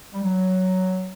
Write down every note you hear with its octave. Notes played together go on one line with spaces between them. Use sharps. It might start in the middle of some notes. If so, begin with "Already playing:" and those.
G3
F#3